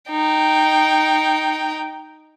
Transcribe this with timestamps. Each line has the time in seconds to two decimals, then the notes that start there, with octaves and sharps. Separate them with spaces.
0.10 D#4 G5